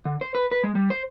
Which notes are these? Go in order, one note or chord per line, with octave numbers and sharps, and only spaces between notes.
D3
C5
B4
B4
G#3
G3
C5